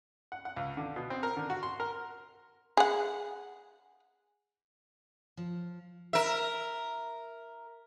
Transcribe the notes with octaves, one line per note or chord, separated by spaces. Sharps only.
F#5
F#5
C#2
D3
B2
C4
A#4
D3
F#4
C6
A#4
G#4 F#5
F3
A#4 E5